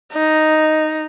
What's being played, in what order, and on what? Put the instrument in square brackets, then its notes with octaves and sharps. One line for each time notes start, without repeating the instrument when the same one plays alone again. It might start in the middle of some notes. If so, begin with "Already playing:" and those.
[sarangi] D#4